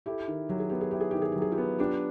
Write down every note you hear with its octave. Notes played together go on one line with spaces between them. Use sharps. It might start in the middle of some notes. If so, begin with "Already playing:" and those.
E4 G4 A4
D#3
F#3 G4
G#4
B3 G4
G#4
E4 G4
G#4
D#3 G4
G#4
F#3 G4
G#4
F4 G4
B3
D4 F4 G4